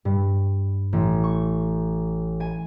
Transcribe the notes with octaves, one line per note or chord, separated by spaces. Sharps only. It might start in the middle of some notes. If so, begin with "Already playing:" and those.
G2
A1
C#6
G#5